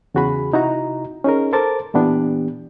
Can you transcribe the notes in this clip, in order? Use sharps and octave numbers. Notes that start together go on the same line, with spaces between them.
E2 C#3 F#4 G#4 B5
C3 D#4 E4 F#4 A#5
C#4 D#4 G#4 A#4
A4 A#4 C5 A5 D6 A6
A#2 E3 B3 D4 G4